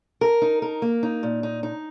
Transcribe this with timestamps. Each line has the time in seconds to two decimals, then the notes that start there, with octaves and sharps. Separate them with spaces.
0.21 A#4
0.42 D#4
0.62 A#4
0.82 A#3
1.03 D#4
1.23 A#2
1.43 D#4
1.63 D#4